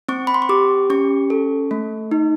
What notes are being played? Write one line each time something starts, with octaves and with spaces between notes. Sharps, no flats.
C4 C#6
B5
C6
C#6
G4 D6
C#4 C#6
A4
A3
D#4